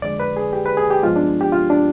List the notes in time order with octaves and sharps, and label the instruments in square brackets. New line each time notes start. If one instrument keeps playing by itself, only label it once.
[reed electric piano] F2 D3 G#3 D5
B4
G#4
G4
B4
G#4
G4
G2 F3 G#3 B3 F4
D4
G4
F4
D4